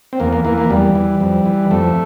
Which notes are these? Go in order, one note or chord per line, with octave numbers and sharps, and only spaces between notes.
C4
E2 A#3
A#3
E3 A#3
A#3
E2 G3
E3
F2
E3
F2 A3